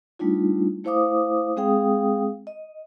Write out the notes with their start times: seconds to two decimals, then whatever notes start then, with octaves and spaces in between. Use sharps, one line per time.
0.19 G3 A3 D4 D#4 F4
0.84 A3 E4 C5 F5 D6 D#6
1.56 G#3 C4 G#4 F5 G5 D#6
2.47 D#5